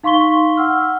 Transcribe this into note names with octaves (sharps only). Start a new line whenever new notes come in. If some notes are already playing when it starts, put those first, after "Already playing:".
D#4 F5 C6 C#6 B6 G7
F#5 E6 F6